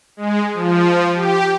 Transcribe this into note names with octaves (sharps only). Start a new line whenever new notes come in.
G#3
F3
G4